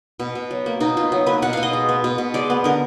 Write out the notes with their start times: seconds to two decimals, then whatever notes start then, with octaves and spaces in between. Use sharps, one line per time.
0.20 B2
0.35 B2
0.51 F#3
0.66 A#3
0.80 B2 D#4
0.97 B2 F4
1.12 F#3
1.26 A#3 B4
1.42 B2 F#5
1.53 B2 F5
1.63 D#5
1.73 G#3
1.89 B3
2.04 B2
2.18 B2
2.34 G#3 D5
2.50 B3
2.64 D3 A#4